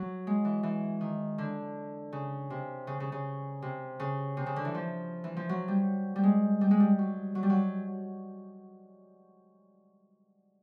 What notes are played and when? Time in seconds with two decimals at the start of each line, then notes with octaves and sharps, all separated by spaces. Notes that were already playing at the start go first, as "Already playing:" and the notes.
Already playing: F#3
0.27 G#3
0.45 E3
0.63 E3
1.01 D#3
1.38 D3
2.13 C#3
2.50 C3
2.87 C#3
3.00 C#3
3.12 C#3
3.62 C3
4.00 C#3
4.37 C3
4.46 C#3
4.56 D3
4.65 E3
4.74 F3
5.24 E3
5.37 F3
5.49 F#3
5.68 G3
6.16 G3
6.24 G#3
6.61 G3
6.71 G#3
6.80 G3
6.99 F#3
7.35 F#3
7.43 G3
7.50 F#3